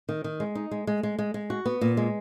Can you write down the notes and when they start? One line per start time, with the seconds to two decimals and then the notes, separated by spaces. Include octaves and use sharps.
0.09 D#3
0.24 D#3
0.40 G#3
0.55 D#4
0.71 G#3
0.87 G#3
1.03 G#3
1.19 G#3
1.34 G#3
1.50 F#4
1.66 B3
1.81 A#2
1.97 G#3